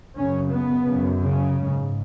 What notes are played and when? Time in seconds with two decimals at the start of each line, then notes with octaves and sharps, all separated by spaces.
0.15 F#2 C#3 C#4
0.51 B3
0.85 F#2 C#3
1.20 C#3
1.55 G#2